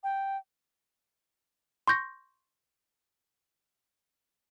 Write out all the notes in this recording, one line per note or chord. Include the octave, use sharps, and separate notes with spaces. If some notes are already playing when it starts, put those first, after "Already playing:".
G5
C6 C#6 G6 A#6